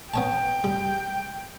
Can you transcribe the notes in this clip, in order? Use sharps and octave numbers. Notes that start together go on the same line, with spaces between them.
B3 C#5 G5 A5
G3